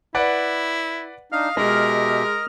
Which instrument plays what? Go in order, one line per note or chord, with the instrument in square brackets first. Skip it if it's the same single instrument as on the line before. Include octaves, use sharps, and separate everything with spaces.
[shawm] E4 [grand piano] B4 D5 F#5
[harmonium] D4 D#4 [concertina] D#5 F6 [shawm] F5
[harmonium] B2 G4 E5 [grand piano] G#3 [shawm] A#4